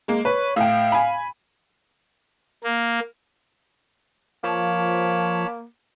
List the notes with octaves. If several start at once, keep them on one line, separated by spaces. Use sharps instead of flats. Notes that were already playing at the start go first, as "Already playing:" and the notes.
G#3 A#3
B4 C#5
A2 F5 G5
G#5 B5
A#3
F3 A#3 C#5 A5 B5